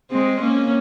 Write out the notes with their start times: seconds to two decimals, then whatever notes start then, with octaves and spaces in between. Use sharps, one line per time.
0.11 G#3 C4
0.40 A#3 C#4